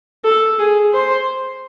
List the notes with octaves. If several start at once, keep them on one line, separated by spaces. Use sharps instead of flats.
A4
G#4
C5